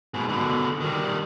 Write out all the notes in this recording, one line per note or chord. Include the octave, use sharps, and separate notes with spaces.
G#2 B2
B2 D3
D#3 G3